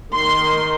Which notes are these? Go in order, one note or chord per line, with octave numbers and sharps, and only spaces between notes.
D#3 C6